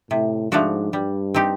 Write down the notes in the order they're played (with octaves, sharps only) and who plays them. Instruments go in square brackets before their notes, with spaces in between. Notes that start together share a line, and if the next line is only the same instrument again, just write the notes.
[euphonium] A2 [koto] C3
[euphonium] G#2 [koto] F3 A3 D4 F#4
[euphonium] G2 [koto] G3
[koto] C4 D#4 G4